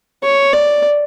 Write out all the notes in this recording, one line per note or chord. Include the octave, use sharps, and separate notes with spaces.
C#5
D5